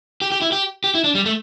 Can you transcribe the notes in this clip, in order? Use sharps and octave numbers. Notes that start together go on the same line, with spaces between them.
G4
G4
E4
G4
G4
E4
D4
G3
A3